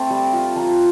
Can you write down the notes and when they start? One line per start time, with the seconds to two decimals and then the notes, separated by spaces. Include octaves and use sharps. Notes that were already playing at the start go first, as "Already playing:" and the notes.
Already playing: A3 C4 D4 A5
0.10 G3
0.33 F4
0.56 F3 A#5